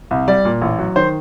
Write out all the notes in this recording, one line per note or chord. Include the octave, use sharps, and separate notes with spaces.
C2
G3 D5
A#2
A1
F#3
D#3 C5